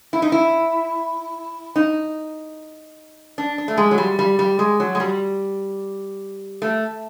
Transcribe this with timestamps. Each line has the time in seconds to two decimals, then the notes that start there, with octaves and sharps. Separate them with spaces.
0.13 E4
0.22 D#4
0.32 E4
1.76 D#4
3.38 D4
3.58 D4
3.68 A3
3.78 G#3
3.91 F#3
3.98 G3
4.19 G3
4.39 G3
4.59 G#3
4.80 F#3
4.95 G#3
5.00 G3
6.62 A3